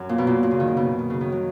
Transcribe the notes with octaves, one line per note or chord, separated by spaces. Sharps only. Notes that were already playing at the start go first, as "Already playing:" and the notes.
Already playing: F#2
A#2
B2
A#2
A#2
C#3
D#3
C#3
B2
D#3
C#3
D#3
F#3